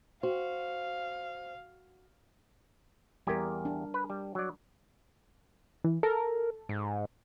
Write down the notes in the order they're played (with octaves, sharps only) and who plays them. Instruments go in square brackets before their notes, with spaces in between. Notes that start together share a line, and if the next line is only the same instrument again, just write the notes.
[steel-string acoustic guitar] F#4 [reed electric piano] C5 [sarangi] F5
[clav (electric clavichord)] E2 G4 G#5 [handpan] G3 A#4
[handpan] D4
[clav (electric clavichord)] B4
G3
F#3 D5
[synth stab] E3
[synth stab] A4 [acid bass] A#4
[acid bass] G#2